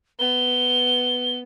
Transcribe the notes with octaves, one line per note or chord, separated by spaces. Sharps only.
B3 G7